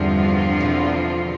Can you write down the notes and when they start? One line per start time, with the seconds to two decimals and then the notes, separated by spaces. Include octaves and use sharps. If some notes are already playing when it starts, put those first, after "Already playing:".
Already playing: E2 G2 D3 F3 C4 F4
0.61 B2